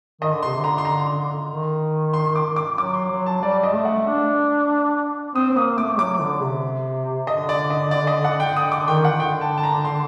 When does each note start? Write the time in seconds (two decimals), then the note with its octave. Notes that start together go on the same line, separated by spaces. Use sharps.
0.21 D#3 D#5
0.33 D3
0.43 C3 C6
0.56 D3
0.64 A#5
0.78 C6
0.85 A#5
1.49 D#3
2.13 C6
2.36 D6
2.56 D6
2.78 F#3 D6
2.94 C6
3.10 F#3
3.26 A5
3.42 G3 D5
3.63 D#5
3.74 A3
3.85 F#5
4.07 D4
5.35 C4 D#6
5.51 C4
5.57 A#3 D#6
5.77 A3 D6
5.99 F#3 D6
6.21 D3
6.42 C3
7.27 D3 D#5
7.49 D5
7.70 D#5
7.91 D5
8.07 D#5
8.24 F#5
8.40 G5
8.56 D3 D#6
8.72 D6
8.81 D3
8.88 D#3 G5
9.05 F#5
9.10 D#3
9.20 D3 G5
9.41 A5
9.58 A5
9.63 A#5
9.85 C6